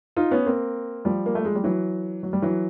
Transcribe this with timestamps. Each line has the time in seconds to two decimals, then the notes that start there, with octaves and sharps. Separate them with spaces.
0.16 D#4 F4
0.31 B3 C#4
0.46 A#3 C4
1.05 F3 G3
1.26 A#3
1.35 A3
1.45 G#3
1.55 G3
1.64 E3 F#3
2.23 F#3
2.33 G3
2.42 E3 F#3